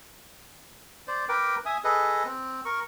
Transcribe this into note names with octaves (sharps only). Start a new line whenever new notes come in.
C5 D5
A#4 B4 G5 D6
E5 G#5 D#6
G#4 A4 B4 D#5
C4
A#4 C#6